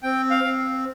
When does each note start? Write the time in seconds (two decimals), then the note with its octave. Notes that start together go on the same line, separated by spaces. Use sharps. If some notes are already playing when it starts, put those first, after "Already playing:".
0.03 C4 G5
0.31 F5
0.44 C4